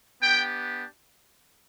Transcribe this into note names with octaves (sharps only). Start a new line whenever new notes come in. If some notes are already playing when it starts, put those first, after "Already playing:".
B3 D4 G4 G5